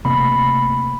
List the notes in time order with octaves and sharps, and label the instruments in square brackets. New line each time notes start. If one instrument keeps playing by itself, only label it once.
[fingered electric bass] C3 A3 A#3 [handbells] B5